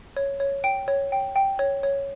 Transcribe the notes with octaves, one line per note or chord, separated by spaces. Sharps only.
C#5
C#5
G5 D7
C#5
G5
G5
C#5
C#5